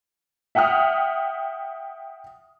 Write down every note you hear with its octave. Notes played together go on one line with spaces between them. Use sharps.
E5 F#5 G5 D#6 F6